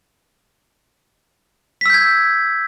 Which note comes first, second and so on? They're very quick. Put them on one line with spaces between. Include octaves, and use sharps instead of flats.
B6 E6 G6 G#6